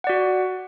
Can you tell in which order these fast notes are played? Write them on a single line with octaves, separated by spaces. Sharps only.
F#5 D5 F#4